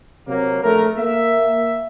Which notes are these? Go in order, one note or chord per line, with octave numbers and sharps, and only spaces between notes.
C3 F#3 A#3
A#1 A3 A#4
A#3 E5